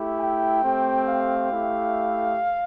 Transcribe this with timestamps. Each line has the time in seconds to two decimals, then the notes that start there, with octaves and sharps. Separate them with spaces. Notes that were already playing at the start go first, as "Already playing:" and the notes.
Already playing: A3 E4 G4
0.20 G5
0.63 A3 C4 G4
1.07 F5
1.50 A3 E4 G4